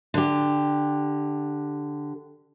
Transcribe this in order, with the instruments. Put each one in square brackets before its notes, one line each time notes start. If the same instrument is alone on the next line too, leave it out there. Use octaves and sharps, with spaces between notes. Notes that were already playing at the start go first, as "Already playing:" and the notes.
[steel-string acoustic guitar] D3 G4